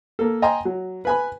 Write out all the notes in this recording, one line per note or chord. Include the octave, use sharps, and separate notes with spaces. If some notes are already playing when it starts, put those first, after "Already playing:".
A#3 A4
D#5 G5 G#5 A#5 C6
F#3
B4 G#5 B5